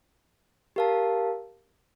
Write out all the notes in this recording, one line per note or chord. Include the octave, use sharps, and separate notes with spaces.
G4 A#4 F5 A5